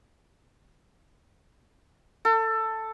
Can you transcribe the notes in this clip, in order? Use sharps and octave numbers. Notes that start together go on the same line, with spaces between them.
A4